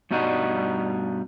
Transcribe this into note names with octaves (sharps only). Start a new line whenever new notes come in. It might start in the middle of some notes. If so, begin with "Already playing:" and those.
G2 B2 G3 D#4 F#4